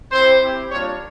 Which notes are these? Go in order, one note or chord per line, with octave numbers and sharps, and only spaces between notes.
C4 E4 G4 C5
C4 E4 G4
G3 A#3 D4 F4 C#5